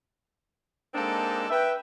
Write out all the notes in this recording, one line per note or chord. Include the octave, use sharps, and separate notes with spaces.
G#3 A#3 C4 D4 D#4 A4
B4 E5 G5